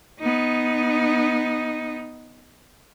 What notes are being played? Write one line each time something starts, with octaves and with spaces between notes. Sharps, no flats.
B3 D#4